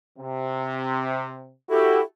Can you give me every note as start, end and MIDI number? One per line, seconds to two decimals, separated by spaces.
0.18 1.52 48
1.70 2.00 64
1.70 2.00 66
1.70 2.00 67
1.70 2.01 69